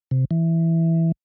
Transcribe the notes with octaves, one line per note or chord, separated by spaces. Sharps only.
C3
E3